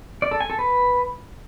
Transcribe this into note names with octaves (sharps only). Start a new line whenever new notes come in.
D5
A4
G#5
A4
B4